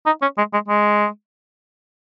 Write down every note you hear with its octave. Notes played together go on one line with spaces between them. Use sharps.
D#4
C#4
G#3
G#3
G#3